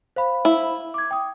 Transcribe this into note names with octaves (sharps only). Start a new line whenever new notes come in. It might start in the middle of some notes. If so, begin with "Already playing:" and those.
C5 F5 B5
E4
D6 G#6
G5 D#6